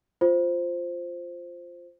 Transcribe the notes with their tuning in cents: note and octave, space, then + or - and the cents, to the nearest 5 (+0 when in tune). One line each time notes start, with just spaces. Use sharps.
F4 +0 C5 +0